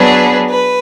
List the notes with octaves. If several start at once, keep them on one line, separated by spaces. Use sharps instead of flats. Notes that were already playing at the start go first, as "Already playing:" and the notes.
Already playing: F#3 B3 D4 G#4 B4
B4